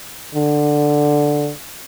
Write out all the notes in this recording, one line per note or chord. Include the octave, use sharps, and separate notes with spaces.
D3